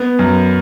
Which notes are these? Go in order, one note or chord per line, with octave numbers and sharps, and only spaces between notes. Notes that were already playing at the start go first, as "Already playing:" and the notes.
Already playing: B3
F#2